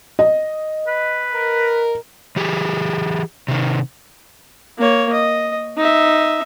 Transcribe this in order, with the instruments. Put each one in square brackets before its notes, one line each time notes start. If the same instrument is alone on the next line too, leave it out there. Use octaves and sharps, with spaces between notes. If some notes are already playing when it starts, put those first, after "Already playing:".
[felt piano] D#5
[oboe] B4
[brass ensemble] A#4
[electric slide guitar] E3 G4 G#4
C3 D#3
[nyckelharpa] A#3 C#5
D#5
D#4 E5